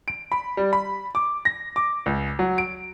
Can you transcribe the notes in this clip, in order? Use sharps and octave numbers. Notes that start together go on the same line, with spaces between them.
D7
B5
G3
B5
D6
A#6
D6
C#2
F#3
D7